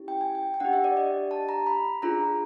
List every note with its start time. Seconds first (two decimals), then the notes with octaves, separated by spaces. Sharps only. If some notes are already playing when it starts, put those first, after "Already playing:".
Already playing: C#4 E4 G4
0.08 G5
0.21 G#5
0.35 G5
0.54 G5
0.60 D4 G4 F#5
0.73 E5
0.84 D5
0.97 D#5
1.31 A5
1.49 A#5
1.67 B5
2.02 D4 F4 G#4 A#5